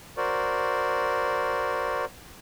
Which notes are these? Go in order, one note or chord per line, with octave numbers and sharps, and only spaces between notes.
F#4 A#4 C5 D5